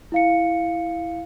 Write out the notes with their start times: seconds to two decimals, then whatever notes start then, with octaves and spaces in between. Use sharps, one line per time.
0.12 E4 F5 C#7